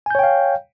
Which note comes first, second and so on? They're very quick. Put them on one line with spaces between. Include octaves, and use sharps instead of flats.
G#5 G6 C#5 G5 F5